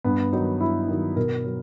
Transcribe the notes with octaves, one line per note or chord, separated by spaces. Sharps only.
G2 B3
D#3 F#3 D#4
G2 E4
D#3 F#3
B2 A#4
F#3